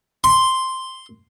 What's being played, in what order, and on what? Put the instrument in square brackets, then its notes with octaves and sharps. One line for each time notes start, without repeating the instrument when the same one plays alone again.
[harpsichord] C6